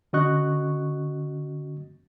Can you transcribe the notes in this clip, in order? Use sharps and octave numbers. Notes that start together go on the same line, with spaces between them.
D3 C#4 F#4 D#5 C#6 F#6